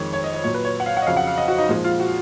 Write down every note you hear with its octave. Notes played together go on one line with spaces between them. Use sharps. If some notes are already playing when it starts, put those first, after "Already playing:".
Already playing: F2 D#3 G#3 C#5
C#5
D#5
D#5
A#2 F#3 C#5
B4
C#5
F#5
F5
F#5
D#5
F2 C#3 F#3 F5
F#5
F5
D#5
F#4
D#4
A#2 F3 G#3
F4
F#4